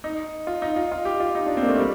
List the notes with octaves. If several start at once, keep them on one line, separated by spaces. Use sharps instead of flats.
D#4
F4
D#4
F4
F4
G4
F4
D#4
D4
C4
A#3
A3
G3